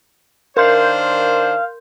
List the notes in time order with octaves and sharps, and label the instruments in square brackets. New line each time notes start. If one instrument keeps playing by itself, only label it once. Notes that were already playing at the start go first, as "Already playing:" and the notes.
[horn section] D#3 D4 C5 [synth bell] A#4 C6 G6 [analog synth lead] F5